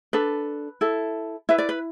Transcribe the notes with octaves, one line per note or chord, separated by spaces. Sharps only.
D4 A4 B4
E4 A4
E4 B4 E5
D5
B4